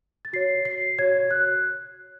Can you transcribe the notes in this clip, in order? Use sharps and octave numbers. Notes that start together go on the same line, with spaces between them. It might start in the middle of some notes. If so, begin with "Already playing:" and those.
A6
F#4 C#5 C7
C7
F#4 C#5 G#6
F#6